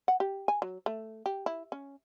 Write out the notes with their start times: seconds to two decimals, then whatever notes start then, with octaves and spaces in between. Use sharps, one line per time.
0.08 F#5
0.20 G4
0.48 G#5
0.62 F#3
0.86 A3
1.26 G4
1.46 E4
1.72 C#4